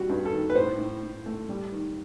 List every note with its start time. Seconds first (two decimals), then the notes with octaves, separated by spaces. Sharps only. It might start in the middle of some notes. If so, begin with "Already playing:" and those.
Already playing: D#3 G3 F#4
0.10 G2
0.25 A4
0.32 D#3
0.50 B4
0.55 A2 C5
0.78 A2
1.03 A2
1.26 A3
1.49 G3
1.72 D#3